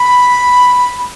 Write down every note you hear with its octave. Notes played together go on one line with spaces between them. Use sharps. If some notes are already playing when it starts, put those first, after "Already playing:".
Already playing: B5